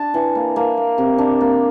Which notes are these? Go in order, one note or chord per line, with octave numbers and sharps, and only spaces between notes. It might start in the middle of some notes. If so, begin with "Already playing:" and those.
Already playing: D4 A5
E3
A#3
A#3
A#3
C3
D4
A#3